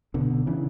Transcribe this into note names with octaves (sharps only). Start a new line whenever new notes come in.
B2 D3
C#3 E3